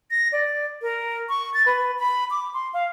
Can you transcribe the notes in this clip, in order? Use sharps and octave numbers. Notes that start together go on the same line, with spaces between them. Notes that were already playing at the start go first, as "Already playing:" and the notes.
A#6
D5
A#4
C#6
A6
B4
B5
D6
C6
F5